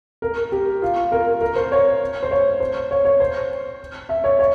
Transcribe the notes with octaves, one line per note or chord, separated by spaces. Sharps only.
A#4
G4
F4
A#4
A#4
C5
C#5
C5
C#5
C5
C#5
C#5
C5
E5
C#5
C#5